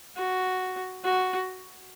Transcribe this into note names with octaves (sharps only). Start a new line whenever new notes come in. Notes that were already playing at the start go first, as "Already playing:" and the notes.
F#4
F#4